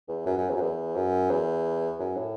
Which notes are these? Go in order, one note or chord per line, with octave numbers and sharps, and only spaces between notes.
E2
F#2
F#2
E2
F#2
E2
F#2
E2
F#2
A2